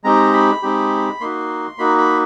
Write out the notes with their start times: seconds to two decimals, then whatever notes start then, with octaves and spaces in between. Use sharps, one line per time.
0.04 G#3 C4 D#4 G4 A#5
0.33 B5
0.62 G#3 C4 D#4 G4
1.20 A#3 D#4 F#4 C6
1.78 A#3 D#4 F#4 B5
1.98 B5